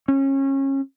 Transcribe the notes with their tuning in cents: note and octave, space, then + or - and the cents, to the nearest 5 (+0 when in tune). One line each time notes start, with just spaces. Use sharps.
C#4 -25